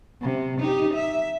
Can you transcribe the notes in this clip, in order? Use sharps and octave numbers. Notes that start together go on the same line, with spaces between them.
C3
D#4 G4
E5